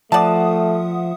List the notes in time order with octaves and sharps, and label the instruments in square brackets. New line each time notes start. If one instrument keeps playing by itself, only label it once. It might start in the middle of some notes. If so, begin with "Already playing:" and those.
[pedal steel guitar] F3 [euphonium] A3 [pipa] D5 A5 [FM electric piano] E5 F#5 D#6